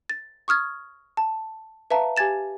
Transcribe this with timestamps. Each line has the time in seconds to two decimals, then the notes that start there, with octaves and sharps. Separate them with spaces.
0.09 A6
0.48 C#6 D#6 F6 G#6
1.17 A5
1.91 B4 E5 F5 A5 A#5
2.17 G4 G#5 G#6 A6 E7